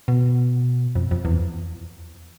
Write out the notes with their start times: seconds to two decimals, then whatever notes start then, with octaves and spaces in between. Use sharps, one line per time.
0.08 B2
0.95 F2
1.11 F2
1.25 E2